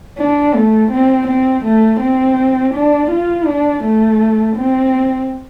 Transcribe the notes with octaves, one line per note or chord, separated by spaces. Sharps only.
D4
A3
C4
C4
A3
C4
D4
F4
D4
A3
C4